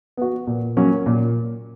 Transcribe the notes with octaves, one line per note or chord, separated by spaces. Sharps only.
B3 F#4
A#2
F#3 A#3 C#4
A#2